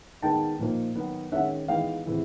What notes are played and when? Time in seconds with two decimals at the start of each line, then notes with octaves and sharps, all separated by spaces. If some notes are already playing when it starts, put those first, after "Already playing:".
0.22 D#3 G#3 B3 D#4 G5 A5
0.59 A#2 F3 A#3 D#4
0.95 D#3 F#3 B3
1.32 D#3 G#3 C#4 E5 F#5
1.68 E3 G#3 B3 D#4 F5 G5
2.05 C3 E3 G#3 B3 E4